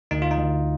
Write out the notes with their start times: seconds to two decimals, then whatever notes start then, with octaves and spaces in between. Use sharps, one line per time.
0.11 D2 D#4
0.22 F4
0.31 D#4
0.37 D2